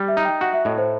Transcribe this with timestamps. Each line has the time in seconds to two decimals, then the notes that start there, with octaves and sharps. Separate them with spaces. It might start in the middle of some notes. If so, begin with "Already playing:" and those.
Already playing: G3
0.08 E5
0.17 D#4
0.25 G5
0.41 F#4 F#5
0.54 E5
0.65 A2 D#5
0.78 C5